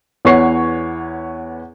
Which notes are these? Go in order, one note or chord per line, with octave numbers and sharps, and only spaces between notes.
E2 B3 C#5 C#6 C7